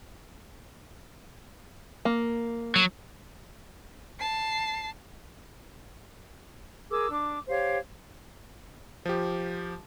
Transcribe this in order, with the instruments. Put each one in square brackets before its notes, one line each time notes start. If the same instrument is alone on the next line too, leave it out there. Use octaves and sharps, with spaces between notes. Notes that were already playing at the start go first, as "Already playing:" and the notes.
[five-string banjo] A#3
[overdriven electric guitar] F#3
[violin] A5 C7
[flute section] G#4 A#4 D6 E6
D4 D6
G4 C5 C#5 F5
[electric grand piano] F3 G4